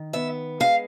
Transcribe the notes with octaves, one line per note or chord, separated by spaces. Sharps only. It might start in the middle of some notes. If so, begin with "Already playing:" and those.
Already playing: D#3
B3 E5
G#3 F5